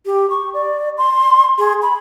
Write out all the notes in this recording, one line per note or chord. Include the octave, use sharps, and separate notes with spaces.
G4
C#6
D5
C6
G#4
B5